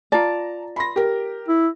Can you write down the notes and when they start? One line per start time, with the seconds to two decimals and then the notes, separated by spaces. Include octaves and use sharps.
0.12 F4 D5 A5 A#5
0.76 B5 C6 A#6
0.96 G4 A#4
1.48 E4